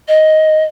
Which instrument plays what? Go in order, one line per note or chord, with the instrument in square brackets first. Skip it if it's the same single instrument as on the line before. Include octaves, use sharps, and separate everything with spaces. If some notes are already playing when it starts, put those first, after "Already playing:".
[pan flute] D#5